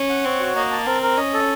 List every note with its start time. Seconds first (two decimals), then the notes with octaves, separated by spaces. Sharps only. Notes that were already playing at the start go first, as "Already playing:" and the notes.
Already playing: C#4
0.09 F#5
0.25 C4 C#5
0.40 F#4
0.56 A#3 D#5
0.72 A5
0.87 C4 A#4
1.02 A#4
1.17 C#4 D#5
1.34 A4